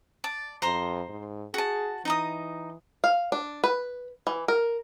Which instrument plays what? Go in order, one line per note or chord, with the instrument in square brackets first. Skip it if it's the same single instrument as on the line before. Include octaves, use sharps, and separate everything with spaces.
[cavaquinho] D5 A5
[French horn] F2 [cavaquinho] C5 A#5 C6
[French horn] G#2
[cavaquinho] F#4 A5 [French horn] G#4
[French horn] E3 [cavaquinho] D#4 A#5 D#6
[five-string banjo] F5
D4
B4
E3
A#4